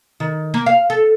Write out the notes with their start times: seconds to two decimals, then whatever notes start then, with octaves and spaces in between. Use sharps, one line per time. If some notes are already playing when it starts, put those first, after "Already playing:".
0.20 D#3
0.54 A#3
0.66 F5
0.90 A4